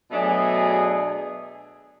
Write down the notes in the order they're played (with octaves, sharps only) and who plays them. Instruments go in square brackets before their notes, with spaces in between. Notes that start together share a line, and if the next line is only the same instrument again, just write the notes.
[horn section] B2 F#3 A3 D4 G#4